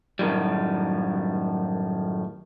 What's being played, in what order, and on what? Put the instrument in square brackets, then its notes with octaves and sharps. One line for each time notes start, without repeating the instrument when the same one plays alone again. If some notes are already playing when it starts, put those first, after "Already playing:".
[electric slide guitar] F#2 A2 D#3 G3